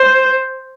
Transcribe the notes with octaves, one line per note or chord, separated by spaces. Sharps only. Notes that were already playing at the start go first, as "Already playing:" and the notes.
Already playing: C5